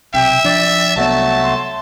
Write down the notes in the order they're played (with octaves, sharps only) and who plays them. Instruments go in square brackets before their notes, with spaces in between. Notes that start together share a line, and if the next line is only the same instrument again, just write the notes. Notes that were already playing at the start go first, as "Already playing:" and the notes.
[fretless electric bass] B1 C3 [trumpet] E5 [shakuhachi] G5
[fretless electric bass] F3 D4 [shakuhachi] D5
[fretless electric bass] C2 B3 [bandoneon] F#3 A3 [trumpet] A5
[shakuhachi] C6